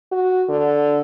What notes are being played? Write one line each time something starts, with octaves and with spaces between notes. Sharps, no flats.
F#4
D3